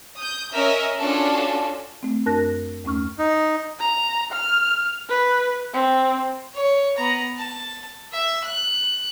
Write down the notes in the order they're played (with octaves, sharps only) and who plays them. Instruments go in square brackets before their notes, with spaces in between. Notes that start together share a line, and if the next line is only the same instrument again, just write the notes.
[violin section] D#6 G6
C#4 A#4 D#5 E5
C#4 D4 F4 F#4 A4
[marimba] A3 C4
F#2 D4 A#4 A5 F#6 A#6
D#2 A3 C#4 C#6 F6
[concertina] D#4
[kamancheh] A#5
F6
B4
C4
[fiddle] C#5
B3 A#5
A5
E5
F#6